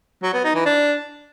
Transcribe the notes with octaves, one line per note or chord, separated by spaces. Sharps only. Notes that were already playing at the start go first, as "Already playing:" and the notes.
F#3
B3
D#4
E3
D4